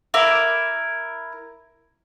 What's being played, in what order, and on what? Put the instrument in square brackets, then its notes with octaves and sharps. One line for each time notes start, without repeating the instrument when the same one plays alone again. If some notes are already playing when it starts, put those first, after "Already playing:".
[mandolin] E4 A#4 D6